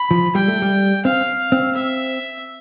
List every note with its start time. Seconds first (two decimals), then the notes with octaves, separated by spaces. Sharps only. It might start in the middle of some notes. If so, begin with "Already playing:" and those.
Already playing: B5
0.11 F3
0.35 G3 G5
0.48 A3
0.62 G3
1.05 C4 F5
1.52 C4
1.75 E5